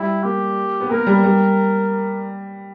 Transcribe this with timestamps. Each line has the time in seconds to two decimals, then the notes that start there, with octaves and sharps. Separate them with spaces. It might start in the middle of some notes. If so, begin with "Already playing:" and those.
Already playing: G3 E4
0.23 A#3 G4
0.81 B3
0.91 A#3 A#4
1.07 G3
1.23 G3